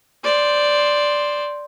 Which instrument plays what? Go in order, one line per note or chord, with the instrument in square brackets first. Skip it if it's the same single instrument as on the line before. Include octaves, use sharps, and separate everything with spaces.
[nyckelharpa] C5 D5